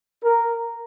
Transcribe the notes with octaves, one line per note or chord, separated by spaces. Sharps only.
A#4